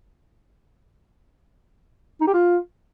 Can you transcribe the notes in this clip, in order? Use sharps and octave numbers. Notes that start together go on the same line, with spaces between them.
D#4
G4
F4